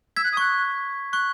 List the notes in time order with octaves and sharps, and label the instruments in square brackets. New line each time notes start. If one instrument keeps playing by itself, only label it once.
[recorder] E6 [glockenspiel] G#6 B6
[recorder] F#6
D#6
[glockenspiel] C#6 [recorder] F#6
[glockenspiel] C#6 [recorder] F#6